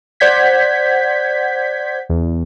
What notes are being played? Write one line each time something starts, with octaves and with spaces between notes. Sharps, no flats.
C5 D5 F#5 G6 G#6 B6
E2